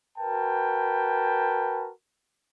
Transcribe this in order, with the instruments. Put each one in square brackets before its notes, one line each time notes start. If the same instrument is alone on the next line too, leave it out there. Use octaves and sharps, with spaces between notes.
[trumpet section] F#4 A#4 B4 G5 A5